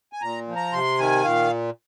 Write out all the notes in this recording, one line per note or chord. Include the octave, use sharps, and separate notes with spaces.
G#5
A#2 A#5
F3
A#5
C3 C6
D#3 G#5
A#2 F5